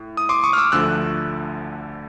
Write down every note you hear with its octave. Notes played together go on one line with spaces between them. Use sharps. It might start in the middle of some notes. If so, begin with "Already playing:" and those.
Already playing: A2
D#6
C6 D6
C#6 D#6
F6
D6 E6
D2 D3 F3 A3 E6 F#6